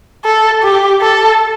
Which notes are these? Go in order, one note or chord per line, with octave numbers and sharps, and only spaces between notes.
A4
G4
A4